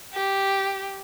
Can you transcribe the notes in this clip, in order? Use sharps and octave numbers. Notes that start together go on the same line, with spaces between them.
G4